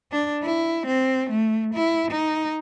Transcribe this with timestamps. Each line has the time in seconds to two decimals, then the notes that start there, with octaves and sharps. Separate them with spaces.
0.12 D4
0.43 E4
0.87 C4
1.30 A3
1.74 E4
2.11 D#4